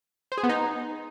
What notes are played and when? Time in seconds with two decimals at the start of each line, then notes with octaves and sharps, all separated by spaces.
0.32 C5
0.38 G#4
0.43 B3
0.49 D#4